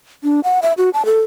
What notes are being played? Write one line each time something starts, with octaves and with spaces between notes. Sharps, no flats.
D4
F#5
E5
F#4
A5
A4